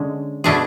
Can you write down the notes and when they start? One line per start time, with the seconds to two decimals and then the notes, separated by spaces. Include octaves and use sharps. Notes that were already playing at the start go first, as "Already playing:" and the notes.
Already playing: D3 G#3 C#4
0.44 B2 A3 D4 G#4